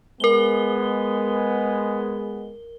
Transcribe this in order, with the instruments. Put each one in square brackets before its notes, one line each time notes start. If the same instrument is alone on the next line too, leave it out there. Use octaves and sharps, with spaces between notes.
[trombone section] G#3 B3 [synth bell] A#4 G7